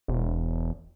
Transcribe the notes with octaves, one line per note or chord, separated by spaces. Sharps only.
E1